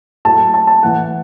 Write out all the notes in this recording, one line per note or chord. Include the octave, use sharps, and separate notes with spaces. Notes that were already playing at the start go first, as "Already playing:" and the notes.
A2 F#3 A3 A5
A5
A5
A2 E3 A3 F#5